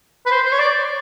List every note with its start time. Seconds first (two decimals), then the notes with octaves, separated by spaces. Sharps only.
0.26 B4
0.31 C5
0.45 C5
0.52 C#5
0.59 D5